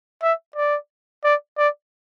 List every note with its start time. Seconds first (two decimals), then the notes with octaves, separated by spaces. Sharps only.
0.22 E5
0.56 D5
1.24 D5
1.58 D5